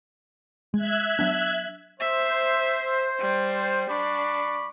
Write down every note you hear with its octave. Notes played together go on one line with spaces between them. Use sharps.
G#3 E5 F#6 G#6
F#3 B3 D4
C5 E5
G3
D4 B5 C#6 D6